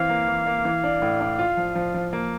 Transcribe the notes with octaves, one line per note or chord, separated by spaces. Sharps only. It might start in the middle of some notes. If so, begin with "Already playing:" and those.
Already playing: E3 C4 F5
A#3
E3
A#3
E3
D4
A2
D4
F4
F3
F3
F3
A#3